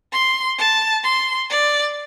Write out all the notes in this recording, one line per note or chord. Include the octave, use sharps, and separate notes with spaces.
C6
A5
C6
D5